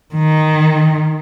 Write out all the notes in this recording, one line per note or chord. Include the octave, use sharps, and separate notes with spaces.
D#3